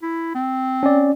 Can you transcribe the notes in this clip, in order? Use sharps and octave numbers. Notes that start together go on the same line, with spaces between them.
E4
C4
C#4 D5